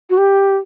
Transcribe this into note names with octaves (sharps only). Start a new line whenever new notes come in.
F#4
G4